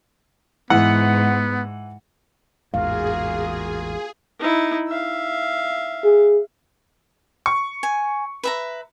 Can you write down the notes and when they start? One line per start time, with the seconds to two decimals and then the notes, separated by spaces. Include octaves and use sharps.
0.70 G#2 E3 B3 F#5
2.74 A1 E2 G#2 A#3 F4 F#4 G#4 F5
4.40 D#4 E4
4.87 E5 F5
6.04 G#4
7.46 C#6
7.83 G#5
8.43 B4 E5 A#5